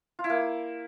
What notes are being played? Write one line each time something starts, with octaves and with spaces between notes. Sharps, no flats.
F4
E4
A#3